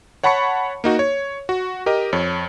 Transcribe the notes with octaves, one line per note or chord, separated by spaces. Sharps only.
C#5 F#5 A5 B5 C#6 C#7
A#3 D#4 F#4
C#5
F#4
G4 A#4 D#5
F2 C#5